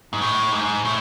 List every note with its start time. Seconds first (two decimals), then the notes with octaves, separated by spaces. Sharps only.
0.13 G#2
0.21 A2
0.52 G#2
0.85 A2